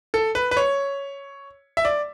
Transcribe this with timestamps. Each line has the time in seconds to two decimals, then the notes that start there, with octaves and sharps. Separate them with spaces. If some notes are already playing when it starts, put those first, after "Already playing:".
0.14 A4
0.35 B4
0.51 B4
0.57 C#5
1.77 E5
1.85 D5